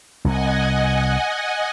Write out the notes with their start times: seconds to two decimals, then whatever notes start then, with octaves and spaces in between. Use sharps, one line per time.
0.25 C2 D#5 F#5 G#5